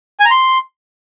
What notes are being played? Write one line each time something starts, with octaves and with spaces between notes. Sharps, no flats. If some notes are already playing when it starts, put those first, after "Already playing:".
G#5
A#5
C6